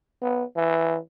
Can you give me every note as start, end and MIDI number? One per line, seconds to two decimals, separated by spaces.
0.22 0.44 59
0.56 0.97 52